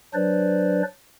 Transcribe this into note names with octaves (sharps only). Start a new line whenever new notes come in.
F#3 D4 B4 C5 D5